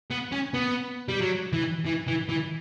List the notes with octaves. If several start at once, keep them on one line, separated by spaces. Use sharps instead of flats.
B3
C#4
B3
G3
F#3
E3
E3
E3
E3